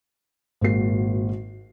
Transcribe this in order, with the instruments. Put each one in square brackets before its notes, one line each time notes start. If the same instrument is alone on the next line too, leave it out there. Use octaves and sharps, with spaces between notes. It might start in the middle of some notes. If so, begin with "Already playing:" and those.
[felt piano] G#1 A#2 G#3 A#3 F#4 C7